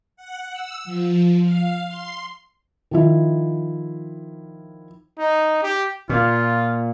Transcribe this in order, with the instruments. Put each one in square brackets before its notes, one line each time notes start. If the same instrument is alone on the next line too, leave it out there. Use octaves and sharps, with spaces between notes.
[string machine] F#5
E6
F3
F5
C6
[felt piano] D#3 F3 E4
[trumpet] D#4
G4
[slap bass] A#2 [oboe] F4